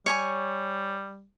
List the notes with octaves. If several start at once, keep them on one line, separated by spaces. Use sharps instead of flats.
G3 C#5 G#5 C#6